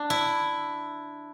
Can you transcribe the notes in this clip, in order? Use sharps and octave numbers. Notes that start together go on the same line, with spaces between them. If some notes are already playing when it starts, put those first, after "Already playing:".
Already playing: D4
E4